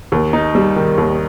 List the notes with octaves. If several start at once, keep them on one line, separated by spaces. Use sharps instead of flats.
D#2
D#4
G3
D#3
D#2